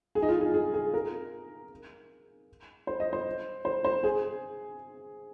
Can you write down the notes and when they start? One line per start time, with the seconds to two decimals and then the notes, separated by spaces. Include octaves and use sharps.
0.15 G#4
0.22 D#4
0.29 F4
0.41 G#4
0.54 G#4
0.74 G#4
0.94 A#4
2.87 C5
3.00 D#5
3.13 C5
3.65 C5
3.84 C5
4.04 G#4